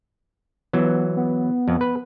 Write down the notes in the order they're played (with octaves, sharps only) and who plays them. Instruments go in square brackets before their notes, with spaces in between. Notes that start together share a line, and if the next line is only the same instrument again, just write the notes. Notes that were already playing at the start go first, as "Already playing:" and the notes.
[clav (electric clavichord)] E3 F#3 [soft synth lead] B3
[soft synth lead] B3
[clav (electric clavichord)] F2
B4